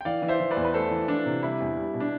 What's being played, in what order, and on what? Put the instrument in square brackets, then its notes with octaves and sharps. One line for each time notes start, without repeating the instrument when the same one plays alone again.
[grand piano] G5
[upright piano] E3 [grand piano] D5 F5
[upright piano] E3
[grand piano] C5 E5
[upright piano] E3
[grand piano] B4 D5
[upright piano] E2
[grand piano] B4
[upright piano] A3 [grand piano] A4 C5
[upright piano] E3
[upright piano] E3 [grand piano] D4
[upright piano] C3
[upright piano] G3 [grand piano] E4
[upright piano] E2
G3
B2
[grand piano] D4